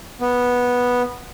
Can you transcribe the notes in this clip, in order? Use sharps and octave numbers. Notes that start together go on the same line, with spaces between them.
B3